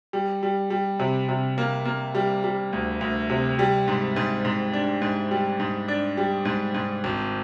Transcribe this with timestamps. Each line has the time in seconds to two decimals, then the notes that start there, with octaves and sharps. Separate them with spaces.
0.13 G3
0.43 G3
0.70 G3
0.99 C3
1.29 C3
1.58 A#3
1.85 A#3
2.15 G3
2.44 G3
2.73 D2
3.01 D2
3.30 C3
3.59 G3
3.88 G#2
4.16 G#2
4.45 G#2
4.73 D4
5.02 G#2
5.31 G3
5.60 G#2
5.88 D4
6.17 G3
6.45 G#2
6.74 G#2
7.04 G#1